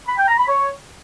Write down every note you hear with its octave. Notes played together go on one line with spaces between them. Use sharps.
B5
G5
A#5
B5
C#5